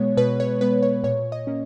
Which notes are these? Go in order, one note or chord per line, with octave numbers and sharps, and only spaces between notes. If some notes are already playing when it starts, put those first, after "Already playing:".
Already playing: B2 G#3 B3 C#5
B2 B4
C#5
G#3 B3 B4
C#5
A#2 C#5
D#5
A#3 C#4